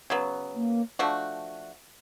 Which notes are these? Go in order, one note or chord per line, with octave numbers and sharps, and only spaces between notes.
C#3 F#3 B3
A#3
F3 A3 D4 F#4